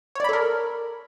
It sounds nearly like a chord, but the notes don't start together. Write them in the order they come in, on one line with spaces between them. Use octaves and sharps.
C#5 D5 B5 A4 A#4